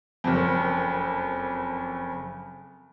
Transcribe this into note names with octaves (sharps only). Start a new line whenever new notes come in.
F#1 F2